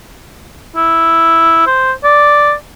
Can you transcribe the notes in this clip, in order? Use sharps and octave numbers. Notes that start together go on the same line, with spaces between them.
E4
C5
D5